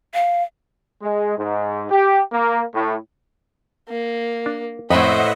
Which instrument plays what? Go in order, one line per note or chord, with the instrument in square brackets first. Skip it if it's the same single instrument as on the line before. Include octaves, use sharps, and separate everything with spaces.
[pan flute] F5
[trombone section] G#3
G#2
G4
A#3
A2
[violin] A#3
[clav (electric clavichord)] D4
[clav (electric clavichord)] F2 [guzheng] A2 B4 B5 [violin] C5 [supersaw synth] D#5 E5 F#5